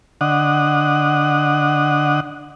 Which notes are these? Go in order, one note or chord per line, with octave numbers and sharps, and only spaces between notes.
D3 D#5 F#5